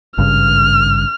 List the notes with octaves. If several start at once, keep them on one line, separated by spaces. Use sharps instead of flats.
G#1 G2 C#3 F6